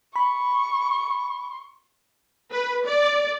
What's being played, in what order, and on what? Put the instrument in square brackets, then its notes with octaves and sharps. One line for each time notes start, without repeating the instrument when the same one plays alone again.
[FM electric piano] B5 [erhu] C#6
[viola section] B4
D5